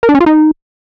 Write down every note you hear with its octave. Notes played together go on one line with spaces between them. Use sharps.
A#4
D4
C#4
F4
D#4